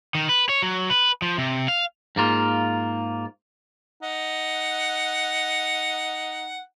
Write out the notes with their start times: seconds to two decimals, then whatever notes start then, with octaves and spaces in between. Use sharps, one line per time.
0.15 D#3
0.29 B4
0.49 C#5
0.62 F#3
0.90 B4
1.22 F3
1.38 C3
1.68 F5
2.16 G#2 A#3 F4
4.03 D#4 F#5